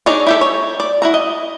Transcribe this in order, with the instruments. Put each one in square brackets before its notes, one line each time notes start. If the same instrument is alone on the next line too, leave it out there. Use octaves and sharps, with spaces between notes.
[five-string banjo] D4 D#4 G#4 C#5 D5
E4 G4 A4
C#5
D5
E4 F#4 A#5
D#5